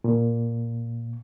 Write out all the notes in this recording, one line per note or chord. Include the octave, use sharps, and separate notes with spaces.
A#2